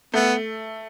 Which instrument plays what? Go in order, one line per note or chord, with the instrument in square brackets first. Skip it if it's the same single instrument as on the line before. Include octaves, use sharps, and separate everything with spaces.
[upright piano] A3 [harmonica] B3